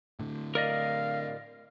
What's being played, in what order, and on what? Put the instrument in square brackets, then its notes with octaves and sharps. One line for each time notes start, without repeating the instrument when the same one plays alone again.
[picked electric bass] A2 D3
[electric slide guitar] A#4 D5 D#5 [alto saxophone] F5